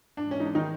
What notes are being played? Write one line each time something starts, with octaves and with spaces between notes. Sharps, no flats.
G#2 E3 G#3 D4
C#4
D#4
D4
D#3 D#4